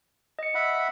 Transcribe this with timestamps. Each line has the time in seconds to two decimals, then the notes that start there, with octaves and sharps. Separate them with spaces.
0.39 D#5 C#7
0.55 E5 F#5 B5